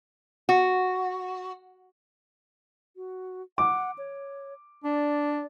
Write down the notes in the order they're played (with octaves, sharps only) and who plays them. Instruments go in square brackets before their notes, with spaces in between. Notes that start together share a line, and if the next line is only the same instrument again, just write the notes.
[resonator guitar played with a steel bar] F#4
[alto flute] F#4
[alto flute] F#5 [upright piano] D6
[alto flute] C#5
[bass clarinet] D4 [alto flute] D5